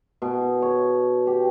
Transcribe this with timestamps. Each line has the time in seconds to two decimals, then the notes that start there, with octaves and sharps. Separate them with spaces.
0.22 B2
0.62 C#5
1.27 G4